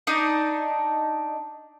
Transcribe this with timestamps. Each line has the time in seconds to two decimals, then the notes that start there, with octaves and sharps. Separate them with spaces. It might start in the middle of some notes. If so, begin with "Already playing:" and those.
0.07 D4 D#4 D#6